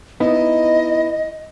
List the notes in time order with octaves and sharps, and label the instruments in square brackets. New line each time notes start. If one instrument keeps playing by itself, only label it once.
[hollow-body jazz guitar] B3 D#4 E4 [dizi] D#5